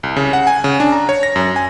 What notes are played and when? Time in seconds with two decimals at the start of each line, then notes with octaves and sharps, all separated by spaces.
0.03 C2
0.16 C#3
0.33 F#5
0.47 G#5
0.64 C#3
0.80 D4
0.92 A#5
1.09 C#5
1.23 A#6
1.36 F#2
1.56 G#5